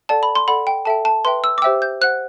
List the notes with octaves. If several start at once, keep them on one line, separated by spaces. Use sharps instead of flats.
A4 D5 F#5 A5
B5
C6
A4 D5 F#5 B5
G5
A4 E5 G5 A5
A5
B4 E5 G5 C6
E6
D6
G4 C5 E5 G5 E6
G6
C5 F#5 F#6